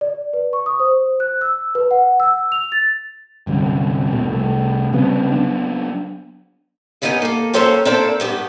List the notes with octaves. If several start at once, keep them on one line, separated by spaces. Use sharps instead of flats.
D5
B4
C#6
D#6
C5
F#6
E6
B4
F#5
E6
F7
A6
G1 C2 F#2
B1 E2 B2 A3
C2 A3
C#3 G3 B3 C4
F#3 B3 D4
G2 D#3 B3 D#4 B4 G#5
A#3 A4
A#3 C#4 A4 C5 C#5 G5
A#3 C4 D4 E4 A4 C5
G2 B3 G4